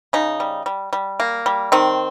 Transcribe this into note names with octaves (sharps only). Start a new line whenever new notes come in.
C#3 D#4
G3
G3
G3
A#3
G3
D#3 C4